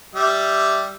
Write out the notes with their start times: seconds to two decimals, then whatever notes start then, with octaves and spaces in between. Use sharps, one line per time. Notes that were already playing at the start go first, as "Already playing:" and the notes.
0.15 G3 G4 E5